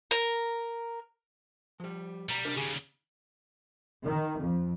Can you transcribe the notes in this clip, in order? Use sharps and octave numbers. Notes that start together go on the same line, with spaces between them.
A#4
F3 G3
B1 G3 A#5
C3 D4 A#4
D#2 C#3 G4 G#4
D#3
F2